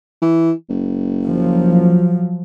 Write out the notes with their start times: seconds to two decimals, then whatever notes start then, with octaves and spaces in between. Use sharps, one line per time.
0.22 E3
0.69 F#1
1.23 F3 F#3